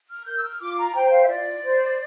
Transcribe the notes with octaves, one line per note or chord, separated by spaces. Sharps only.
F6
A#4 G6
E6
F6
F4 D6
A#5
C5 G5
F5
E5
F4 D5
C5